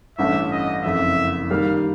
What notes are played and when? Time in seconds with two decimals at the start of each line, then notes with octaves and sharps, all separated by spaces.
0.18 A1 G2 E3 A3 C#4 E5
0.52 D#5
0.83 F#1 F2 C#3 E5
1.50 D#3 G3 A#3 F5